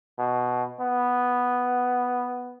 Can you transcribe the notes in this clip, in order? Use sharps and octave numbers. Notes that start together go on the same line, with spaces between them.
B2
B3